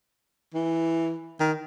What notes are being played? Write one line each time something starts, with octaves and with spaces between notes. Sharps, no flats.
E3
D#3